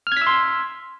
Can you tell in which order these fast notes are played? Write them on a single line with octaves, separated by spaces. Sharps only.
F6 G#6 B6 E6 C6